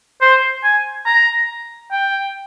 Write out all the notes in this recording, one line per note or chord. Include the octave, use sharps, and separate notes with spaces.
C5
G#5
A#5
G5